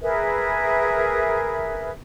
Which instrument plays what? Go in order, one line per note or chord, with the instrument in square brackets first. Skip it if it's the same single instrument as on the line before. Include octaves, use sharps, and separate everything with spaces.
[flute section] G#4 A#4 B4 E5